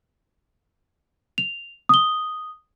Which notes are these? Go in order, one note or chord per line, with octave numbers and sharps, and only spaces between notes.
F7
D#6 G7